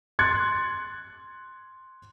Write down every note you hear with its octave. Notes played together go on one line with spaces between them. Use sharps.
C6 F#6 G#6 A6 C#7